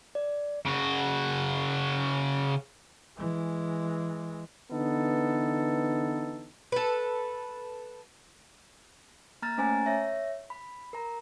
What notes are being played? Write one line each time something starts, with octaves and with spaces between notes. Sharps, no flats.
D5
C#3 F#4
E3 G#3
D3 E3 B3 D#4 A4
A4 B4
A#3 A#5 F6 A6
A3 C#4 C5 G#5 A#5 A6
C#5 E5 A#6
B5
A#4 A#5